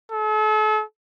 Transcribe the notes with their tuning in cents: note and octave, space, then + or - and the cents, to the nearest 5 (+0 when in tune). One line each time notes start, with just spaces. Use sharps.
A4 -40